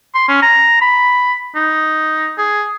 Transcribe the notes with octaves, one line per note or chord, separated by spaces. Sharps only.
C6
C#4
A#5
B5
D#4
G#4